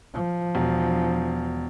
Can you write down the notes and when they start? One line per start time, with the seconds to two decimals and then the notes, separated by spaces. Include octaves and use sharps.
0.14 F3
0.55 E1